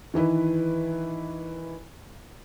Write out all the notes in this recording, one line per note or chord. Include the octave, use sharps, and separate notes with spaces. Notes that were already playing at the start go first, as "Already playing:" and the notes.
D#3 E3 E4 B4